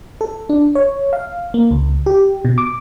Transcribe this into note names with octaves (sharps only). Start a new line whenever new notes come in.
A4
D4
C#5
F5
A#3
C#2
G4
B2
D6